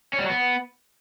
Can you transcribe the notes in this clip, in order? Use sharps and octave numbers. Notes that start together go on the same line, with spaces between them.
C#4
G3
F#3
B3